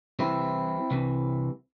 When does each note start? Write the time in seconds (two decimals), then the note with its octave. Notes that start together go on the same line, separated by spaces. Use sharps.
0.19 C2 C3 E3 C4 E4
0.91 C2 C3 E3